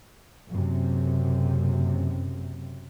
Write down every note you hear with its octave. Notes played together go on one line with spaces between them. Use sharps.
F#1 F#2 C3